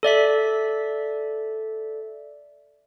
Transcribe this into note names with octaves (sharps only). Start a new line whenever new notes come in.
A4 D5 E5 B6